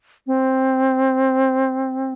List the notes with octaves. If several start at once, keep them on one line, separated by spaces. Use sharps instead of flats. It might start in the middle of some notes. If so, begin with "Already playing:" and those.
C4